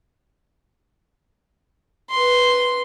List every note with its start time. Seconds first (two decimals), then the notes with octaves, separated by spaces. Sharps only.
2.10 B4 C6